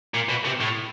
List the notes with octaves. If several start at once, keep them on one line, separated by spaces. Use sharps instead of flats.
A#2
B2
C3
A2